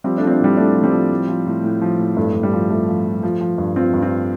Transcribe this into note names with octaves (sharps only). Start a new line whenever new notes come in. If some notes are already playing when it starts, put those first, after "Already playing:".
F3 G3 C4
A3 D4
F3 C4
A3 D4
A2 G3 C4
A2 A3 D4
F3
G3 C4
F3
A2
F3
A2
A2
F3
A2
G2 A3
G2
G3
F3
F3 A3
F3
F3
F3
F3
G2
F3 C4 F4
G2
C4 F4